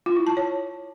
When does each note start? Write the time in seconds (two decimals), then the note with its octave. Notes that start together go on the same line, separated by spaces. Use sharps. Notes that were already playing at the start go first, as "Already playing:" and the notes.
0.06 F4
0.16 E4
0.27 A5
0.37 C#5